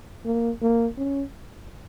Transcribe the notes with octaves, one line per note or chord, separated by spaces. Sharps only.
A#3
A#3
C#4